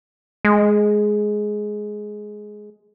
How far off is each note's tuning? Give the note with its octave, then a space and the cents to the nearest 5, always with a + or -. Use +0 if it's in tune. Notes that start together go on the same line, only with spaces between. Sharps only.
G#3 +10